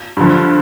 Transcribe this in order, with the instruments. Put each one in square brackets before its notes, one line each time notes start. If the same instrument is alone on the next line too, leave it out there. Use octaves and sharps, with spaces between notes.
[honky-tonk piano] G2 D3 F3